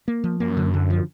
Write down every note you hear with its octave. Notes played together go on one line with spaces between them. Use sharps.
A#3
F3
F#2 A#3
D3
D3
F3